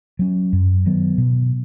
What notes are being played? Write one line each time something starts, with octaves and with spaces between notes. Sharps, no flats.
F#3 C#4
F#2
D#3 F#3 B3
B2